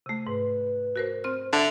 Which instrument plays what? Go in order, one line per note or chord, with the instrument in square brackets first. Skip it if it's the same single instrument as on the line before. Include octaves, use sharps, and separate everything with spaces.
[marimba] C3 A3
[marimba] G#2 [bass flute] B4
[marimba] F#4 A#4 C5
[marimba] C4 F6 [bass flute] C5
[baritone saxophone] D3 [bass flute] E5